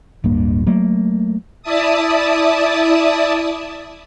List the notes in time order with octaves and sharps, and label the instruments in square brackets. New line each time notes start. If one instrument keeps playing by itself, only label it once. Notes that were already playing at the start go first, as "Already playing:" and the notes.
[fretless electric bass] D1 G2 A#3
F#3 A3 A#3
[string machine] E4 D5 E5 A5 D#6